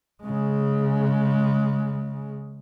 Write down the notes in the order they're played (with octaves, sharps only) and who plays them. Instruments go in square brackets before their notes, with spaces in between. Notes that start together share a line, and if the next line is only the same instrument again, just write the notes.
[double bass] C#3 G#3